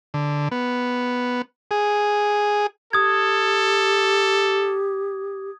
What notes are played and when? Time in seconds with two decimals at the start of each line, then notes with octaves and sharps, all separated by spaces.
0.14 D3
0.51 B3
1.71 G#4
2.93 G4 A4 D#6 G#6